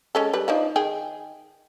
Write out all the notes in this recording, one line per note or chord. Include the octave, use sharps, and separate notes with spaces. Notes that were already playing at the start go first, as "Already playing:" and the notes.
G#3 C#4 A4
G3 B4
F3 D4 D#4
D#3 G#4 G5